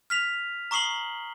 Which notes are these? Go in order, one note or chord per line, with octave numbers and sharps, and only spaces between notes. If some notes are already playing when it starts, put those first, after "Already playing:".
F6 B6 F7
A#5 C#6 D#6 C7 F#7 G7